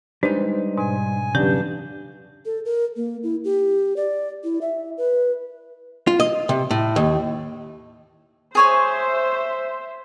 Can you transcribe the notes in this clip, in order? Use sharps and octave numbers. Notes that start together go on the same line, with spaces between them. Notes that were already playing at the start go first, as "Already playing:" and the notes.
G3 G#3 D4 D#4 B4 C5
G#2 B2 G#5
E2 G2 C#3 F#3 D4 D#4 G4 G6
A4
A#4
A#3
E4
G4
D5
E4
E5
B4
F4
D#5
C3
A2
D#2
G#4 C5 C#5 E5 G#5